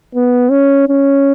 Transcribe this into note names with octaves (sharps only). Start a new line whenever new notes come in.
B3
C#4
C#4